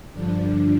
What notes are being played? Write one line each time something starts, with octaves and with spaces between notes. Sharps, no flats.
G2 D3 F3 D4